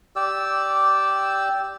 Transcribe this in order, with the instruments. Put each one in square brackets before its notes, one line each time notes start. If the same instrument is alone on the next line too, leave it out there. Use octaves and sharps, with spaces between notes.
[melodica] G4 D5 E6